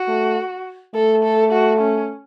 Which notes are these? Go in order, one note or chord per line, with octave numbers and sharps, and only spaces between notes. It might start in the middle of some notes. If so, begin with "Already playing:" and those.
Already playing: F#4
A3
A3 A4
A4
F#4
C#4